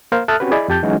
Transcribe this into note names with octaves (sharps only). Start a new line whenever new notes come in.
A#3 A#4 C5 F5
A4 E5 A5 D#6 F6 F#6
C4 C#4 F#4 G4 B4
E4 G#4 D5 D#5 B5
F2 G4 A5 G6
E3 F#3 G#3 C#4 D#4 F#4